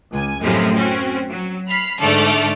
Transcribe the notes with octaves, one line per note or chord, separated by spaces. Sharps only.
C#2 G#5
F#2 A2 C3 F3 G#3
C4 C#4 F#4
F#3
B5 F6 B6 C7
G#2 D3 A3 A4 D5 F6